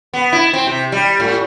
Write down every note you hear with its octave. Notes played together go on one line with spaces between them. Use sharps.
B3
E4
C4
C3
G3
A2